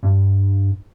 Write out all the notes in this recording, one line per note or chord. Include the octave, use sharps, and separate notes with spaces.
G2